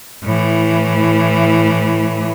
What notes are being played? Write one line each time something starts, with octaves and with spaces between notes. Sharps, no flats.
A2 E3